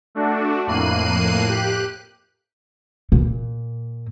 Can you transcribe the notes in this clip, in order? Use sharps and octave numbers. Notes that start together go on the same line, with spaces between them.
A3 D4 F#4
F2 A2 A#3 F#6 C7 D#7
G4 F#6
A#2